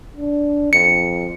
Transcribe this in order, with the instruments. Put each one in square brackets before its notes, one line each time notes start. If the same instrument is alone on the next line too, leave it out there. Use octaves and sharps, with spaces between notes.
[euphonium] D4
[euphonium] F2 [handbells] C#7